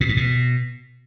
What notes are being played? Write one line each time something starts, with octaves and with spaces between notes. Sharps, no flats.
A#2
G#2
B2